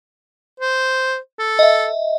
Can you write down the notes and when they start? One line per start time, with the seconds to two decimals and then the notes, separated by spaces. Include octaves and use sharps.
0.60 C5
1.39 A4
1.59 D#5 E5